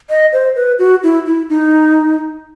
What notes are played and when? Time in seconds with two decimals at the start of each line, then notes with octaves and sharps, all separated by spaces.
0.10 D#5
0.33 C5
0.56 B4
0.79 F#4
1.03 E4
1.26 E4
1.50 D#4